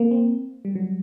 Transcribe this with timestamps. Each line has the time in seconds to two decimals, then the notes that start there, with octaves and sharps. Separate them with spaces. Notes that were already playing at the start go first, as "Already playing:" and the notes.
Already playing: A#3 C4
0.11 C4
0.65 G3
0.75 F#3